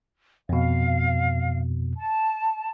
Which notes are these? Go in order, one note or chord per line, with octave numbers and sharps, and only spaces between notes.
F2 B2 F5
A5